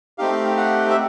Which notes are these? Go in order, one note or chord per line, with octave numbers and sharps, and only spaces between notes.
A3 C4 D#4 G4 F5
F#5
E5